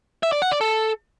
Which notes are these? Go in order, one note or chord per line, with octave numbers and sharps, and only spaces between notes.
E5
D5
F#5
D5
A4